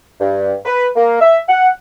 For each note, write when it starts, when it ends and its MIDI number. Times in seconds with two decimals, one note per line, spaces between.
0.20 0.53 43
0.65 0.87 71
0.96 1.19 58
1.20 1.38 76
1.49 1.69 78